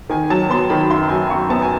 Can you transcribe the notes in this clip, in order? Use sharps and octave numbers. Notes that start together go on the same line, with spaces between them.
D#3 G#5
F#3 A5
B3 C6
D#3 B5
F#2 C6
F#3 G#5
F#2 C#6
B3 A5
G#5